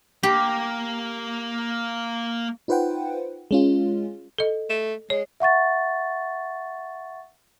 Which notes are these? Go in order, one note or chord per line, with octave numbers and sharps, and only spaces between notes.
A#3 G4
D#4 F4 B4 C5 F#5 G5
G#3 C#4 F4
A4 D#5
A3
G#3 C#5
E5 F#5 C#6 A6